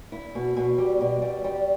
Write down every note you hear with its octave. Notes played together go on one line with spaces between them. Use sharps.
E4
B2
B2
G3
B2
G3
G3